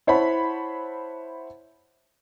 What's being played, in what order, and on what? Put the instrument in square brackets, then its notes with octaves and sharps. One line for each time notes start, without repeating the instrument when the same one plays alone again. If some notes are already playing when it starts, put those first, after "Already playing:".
[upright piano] E4 C5 C#5 F#5 A5 B5